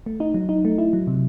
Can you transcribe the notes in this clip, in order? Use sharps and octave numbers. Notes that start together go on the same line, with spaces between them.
A3
D#4
F#3
D#4
A3
E4
F#3
C3